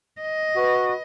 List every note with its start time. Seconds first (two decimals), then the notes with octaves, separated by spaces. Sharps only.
0.21 D#5
0.56 F#4 B4